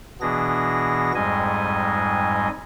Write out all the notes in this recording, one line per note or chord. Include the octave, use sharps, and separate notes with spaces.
B2 E3 B3 D4 G#4 A#6
F2 G#2 G3 G#3 D#5 G#5